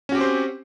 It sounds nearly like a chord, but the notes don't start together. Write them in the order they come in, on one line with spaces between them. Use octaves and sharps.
C#4 F#4 G4 C4 C5